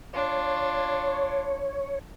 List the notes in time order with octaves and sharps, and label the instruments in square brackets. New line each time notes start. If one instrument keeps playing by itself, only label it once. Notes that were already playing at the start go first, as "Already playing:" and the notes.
[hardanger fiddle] D4 F4 [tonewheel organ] C#5